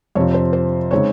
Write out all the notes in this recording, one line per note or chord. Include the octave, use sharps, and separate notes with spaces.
F2 C3 F3 C#5
C5
C5
C#3 G#3 C4 D#4 C#5